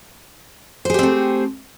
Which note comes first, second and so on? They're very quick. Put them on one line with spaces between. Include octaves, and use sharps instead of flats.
C5 G#4 G4 C4 A3